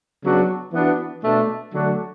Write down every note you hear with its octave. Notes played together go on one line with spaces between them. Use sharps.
C#3 F#3 B3 D4 F#4
E3 B3 D4 F#4
B2 A3 D4
D3 F#3 A3 D4 F#4